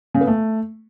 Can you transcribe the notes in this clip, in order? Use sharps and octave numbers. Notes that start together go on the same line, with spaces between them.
C#3
B3
A3